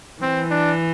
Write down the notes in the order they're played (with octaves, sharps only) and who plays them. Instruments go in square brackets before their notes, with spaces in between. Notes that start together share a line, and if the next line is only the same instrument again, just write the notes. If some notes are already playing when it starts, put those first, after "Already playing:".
[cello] E3 [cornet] C4
[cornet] D4